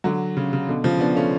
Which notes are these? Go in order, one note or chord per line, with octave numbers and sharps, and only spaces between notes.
D3 F#3
C#3
C#3
B2 D3
C#3 F3
B3 D4
A3 C#4